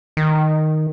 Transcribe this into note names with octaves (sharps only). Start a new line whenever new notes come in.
D#3